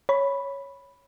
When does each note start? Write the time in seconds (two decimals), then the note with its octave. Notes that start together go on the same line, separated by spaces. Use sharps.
0.09 C#5 B5